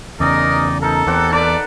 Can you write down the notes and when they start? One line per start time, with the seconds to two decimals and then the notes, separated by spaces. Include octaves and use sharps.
0.20 E2 C#3 D#4 A#4 D5 D#5
0.82 D#4 A4 A#4
1.07 E2 C4 G4 F#5
1.32 A4 B4 D5 A5